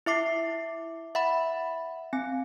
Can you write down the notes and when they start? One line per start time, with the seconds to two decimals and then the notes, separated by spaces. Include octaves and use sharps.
0.06 E4 E5 D6 C7
1.15 E5 F#5 B5
2.13 C4 G#5